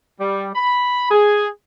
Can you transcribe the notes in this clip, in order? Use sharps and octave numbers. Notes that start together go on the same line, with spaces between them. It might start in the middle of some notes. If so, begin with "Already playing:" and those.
G3
B5
G#4